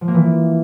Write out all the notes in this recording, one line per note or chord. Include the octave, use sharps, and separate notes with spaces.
F3
A#3
E3